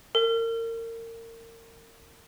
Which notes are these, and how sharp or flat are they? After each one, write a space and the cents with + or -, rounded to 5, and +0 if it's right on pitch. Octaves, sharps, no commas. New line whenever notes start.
A#4 -30